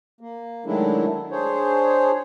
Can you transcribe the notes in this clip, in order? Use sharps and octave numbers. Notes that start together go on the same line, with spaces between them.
A#3
D#3 F#3 G#3 A3 D4 E4
D4 G#4 C5 C#5